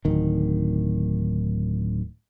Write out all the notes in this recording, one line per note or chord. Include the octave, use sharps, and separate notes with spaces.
D1 D#3